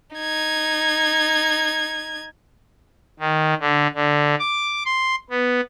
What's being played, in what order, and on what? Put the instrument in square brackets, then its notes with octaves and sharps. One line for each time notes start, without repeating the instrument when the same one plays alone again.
[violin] D#4 G#6
[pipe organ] D#3
D3
D3
D6
C6
B3